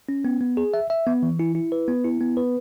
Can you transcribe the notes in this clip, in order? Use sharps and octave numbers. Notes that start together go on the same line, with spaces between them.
C#4
B3
B3
G#4
E5
E5
B3
E3
E4
E4
B4
B3
E4
B3
B4